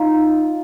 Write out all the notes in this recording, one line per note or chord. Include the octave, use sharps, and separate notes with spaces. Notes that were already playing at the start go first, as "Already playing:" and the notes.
Already playing: D#4 F4